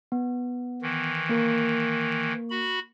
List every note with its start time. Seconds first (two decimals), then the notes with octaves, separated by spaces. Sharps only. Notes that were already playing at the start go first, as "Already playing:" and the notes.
0.12 B3
0.82 D#3 E3
1.29 A#3 A#4 C#6
2.51 F#4 B5